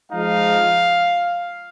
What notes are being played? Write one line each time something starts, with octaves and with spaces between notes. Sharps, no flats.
F3 G#3 D#4 F5